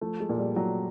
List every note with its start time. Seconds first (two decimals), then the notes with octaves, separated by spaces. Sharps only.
0.01 F3 A3
0.20 G#3
0.29 A#2
0.38 G3
0.56 A#2 F#3